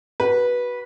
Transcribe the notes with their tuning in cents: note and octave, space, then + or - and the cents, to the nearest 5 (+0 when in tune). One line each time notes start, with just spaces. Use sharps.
F#4 +25 B4 -15